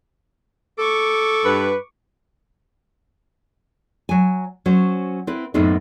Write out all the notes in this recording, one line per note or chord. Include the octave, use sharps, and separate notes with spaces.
A4 C#6 D6
G2 B4
F#3 G#5
F#3 C#4 C5
C4 E4 B4
F#2 A2 A3 B3 C4 D#4